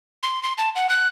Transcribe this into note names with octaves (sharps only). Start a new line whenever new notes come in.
C6
C6
A5
F#5
F#6